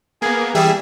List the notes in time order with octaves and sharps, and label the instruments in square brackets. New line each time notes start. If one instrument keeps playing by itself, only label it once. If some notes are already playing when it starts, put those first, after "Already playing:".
[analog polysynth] A#3 B3 [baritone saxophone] G#4
[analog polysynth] E3 G#4 E5 [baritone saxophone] G3